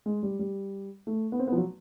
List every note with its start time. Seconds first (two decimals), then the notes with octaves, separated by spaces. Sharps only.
0.06 G#3
0.23 G3
0.39 G3
1.07 A3
1.32 B3
1.39 C4
1.47 B3
1.52 F3
1.57 F#3